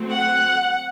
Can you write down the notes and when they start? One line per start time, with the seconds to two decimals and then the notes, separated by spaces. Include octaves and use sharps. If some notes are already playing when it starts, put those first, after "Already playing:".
Already playing: F#3 A3 C4
0.11 F#5